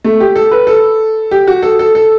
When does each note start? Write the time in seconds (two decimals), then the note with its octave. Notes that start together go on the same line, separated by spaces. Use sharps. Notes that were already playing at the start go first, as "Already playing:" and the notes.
0.04 A3
0.20 G4
0.36 A4
0.51 B4
0.67 A4
1.31 G4
1.47 F#4
1.62 A4
1.79 A4
1.95 A4